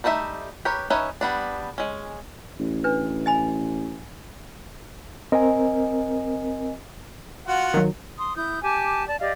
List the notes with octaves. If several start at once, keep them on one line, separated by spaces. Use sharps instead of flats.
G3 A3 D#4 F#4 E5
G4 A#4 B4 C#5
C#4 D#4 B4 C#5 E5
G3 B3 D4
G#3 C#4
A1
D4 B4
D#5 G#5 B5
C4 A#4 D#5 G#5
F4 F#4 F#5
D#3 F#3
C6 D#6
E4 D#6 G6
G4 G#5 A5 D6
D5 A5
G4 D5 D#5 F5